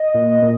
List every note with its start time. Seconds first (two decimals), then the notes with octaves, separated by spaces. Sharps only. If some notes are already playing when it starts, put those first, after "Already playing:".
Already playing: D#5
0.14 A#2
0.42 A#2